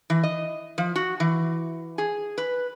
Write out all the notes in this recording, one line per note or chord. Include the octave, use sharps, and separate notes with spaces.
E3
D#5
F3
F#4
E3
G#4
B4